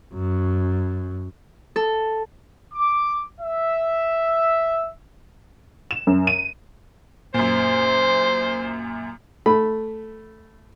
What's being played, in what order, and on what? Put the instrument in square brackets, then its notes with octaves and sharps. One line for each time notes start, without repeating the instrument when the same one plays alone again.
[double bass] F#2
[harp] A4
[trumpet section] D6
E5
[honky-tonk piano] E7
F#2
D#7
[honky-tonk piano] F#2 A#2 [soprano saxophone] C5
[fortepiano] A3 B5